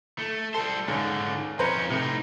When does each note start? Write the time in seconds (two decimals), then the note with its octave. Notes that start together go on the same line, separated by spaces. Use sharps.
0.18 A3
0.54 G3 A4 C5
0.88 C#2 G#2 D3
1.59 F2 C#4 B4 C5 A#5
1.90 A2 C3 D#4